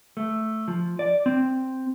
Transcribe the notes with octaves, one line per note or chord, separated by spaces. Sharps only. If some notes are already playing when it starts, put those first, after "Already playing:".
A3
F3
D5
C4